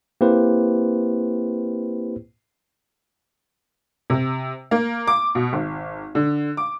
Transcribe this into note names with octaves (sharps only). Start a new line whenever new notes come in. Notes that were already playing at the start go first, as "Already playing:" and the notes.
A#3 C4 E4 G4 B4 C5
C3
A#3
D6
B2
G#1
D3
D6